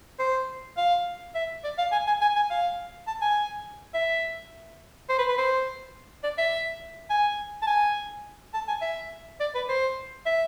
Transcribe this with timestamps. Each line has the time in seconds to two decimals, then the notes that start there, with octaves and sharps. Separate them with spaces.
0.19 C5
0.77 F5
1.35 E5
1.64 D5
1.78 F5
1.92 G#5
2.07 G#5
2.21 G#5
2.36 G#5
2.50 F5
3.07 A5
3.21 G#5
3.94 E5
5.09 C5
5.18 B4
5.28 B4
5.38 C5
6.24 D5
6.38 E5
7.10 G#5
7.62 A5
7.67 G#5
8.54 A5
8.68 G#5
8.82 E5
9.40 D5
9.55 B4
9.69 C5
10.26 E5